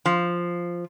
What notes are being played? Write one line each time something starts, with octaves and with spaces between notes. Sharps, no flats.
F3